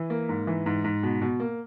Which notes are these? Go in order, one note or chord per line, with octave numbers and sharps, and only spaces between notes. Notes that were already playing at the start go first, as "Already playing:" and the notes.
Already playing: E3
A#3
G#2
E3
G#2
G#2
B2
B2
A#3